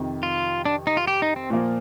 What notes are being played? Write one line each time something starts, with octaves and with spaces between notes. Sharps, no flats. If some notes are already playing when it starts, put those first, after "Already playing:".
Already playing: F2 C3 D#3
F4
D4
D#4
F4
G4
D#4
C4
A#2 F3 A#3